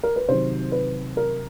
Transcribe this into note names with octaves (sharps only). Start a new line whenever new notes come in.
A#4
B4
C3 D#3 F#3 C5
B4
A#4